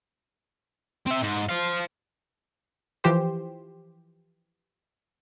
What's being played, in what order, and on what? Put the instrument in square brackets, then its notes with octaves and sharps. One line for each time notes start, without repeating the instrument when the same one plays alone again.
[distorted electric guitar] C4 E5
G#2
C5 F5
[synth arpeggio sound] E3 F3 G4 C5